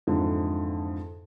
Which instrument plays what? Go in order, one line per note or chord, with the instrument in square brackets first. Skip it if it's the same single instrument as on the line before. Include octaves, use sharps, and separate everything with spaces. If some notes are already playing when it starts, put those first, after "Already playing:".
[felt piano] F2 G#2 D3 E3